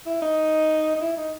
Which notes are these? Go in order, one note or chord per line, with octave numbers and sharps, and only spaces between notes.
E4
D#4
D#4
E4
D#4